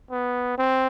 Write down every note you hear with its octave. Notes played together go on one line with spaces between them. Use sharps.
B3
C4